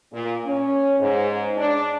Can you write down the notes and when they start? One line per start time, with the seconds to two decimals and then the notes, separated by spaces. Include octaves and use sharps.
0.12 A#2
0.46 C#4
0.99 G#2
1.57 D4